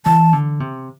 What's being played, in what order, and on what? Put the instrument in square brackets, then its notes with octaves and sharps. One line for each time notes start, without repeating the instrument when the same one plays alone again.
[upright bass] E3 [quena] A5
[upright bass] D3
C3